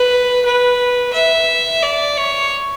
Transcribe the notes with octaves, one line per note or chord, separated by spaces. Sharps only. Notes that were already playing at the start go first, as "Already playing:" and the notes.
Already playing: B4
B4
E5
D5
C#5